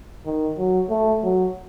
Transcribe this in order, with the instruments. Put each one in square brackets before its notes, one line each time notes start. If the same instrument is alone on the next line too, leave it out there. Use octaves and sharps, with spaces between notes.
[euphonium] D#3
F#3
A3
F#3